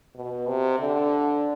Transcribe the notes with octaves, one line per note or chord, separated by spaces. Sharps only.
B2
C3
D3